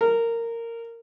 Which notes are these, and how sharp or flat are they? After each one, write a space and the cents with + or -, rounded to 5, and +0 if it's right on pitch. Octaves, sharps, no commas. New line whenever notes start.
A#4 -15